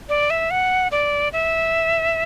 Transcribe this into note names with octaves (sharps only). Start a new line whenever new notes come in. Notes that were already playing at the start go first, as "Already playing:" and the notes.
D5
E5
F#5
D5
E5